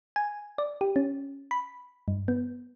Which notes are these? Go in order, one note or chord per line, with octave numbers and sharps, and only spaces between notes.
G#5
D5
G4
C#4
B5
G2
B3